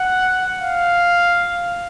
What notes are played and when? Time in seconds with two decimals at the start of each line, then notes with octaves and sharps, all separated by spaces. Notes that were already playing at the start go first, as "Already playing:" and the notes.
Already playing: F#5
0.59 F5